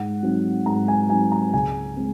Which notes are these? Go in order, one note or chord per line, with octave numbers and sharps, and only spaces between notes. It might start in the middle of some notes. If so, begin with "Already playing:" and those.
Already playing: G#2 F#5
F#3 C4 D#4
G#2 A#5
G#5
F#3 C4 D#4 G#5
A#5
C#2 G#5
G#3 C4